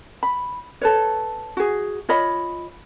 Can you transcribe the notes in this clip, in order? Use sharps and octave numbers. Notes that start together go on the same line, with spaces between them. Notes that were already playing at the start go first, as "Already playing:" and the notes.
B5
A4 B4 C#5
F#4 G#4
F4 C#5 D#5 B5